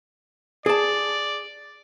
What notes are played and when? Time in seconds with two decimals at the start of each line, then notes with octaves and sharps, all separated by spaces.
0.66 G#4 D5 A5